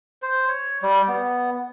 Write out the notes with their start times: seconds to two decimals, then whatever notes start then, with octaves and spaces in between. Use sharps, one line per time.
0.22 C5
0.48 C#5
0.82 G3
1.08 B3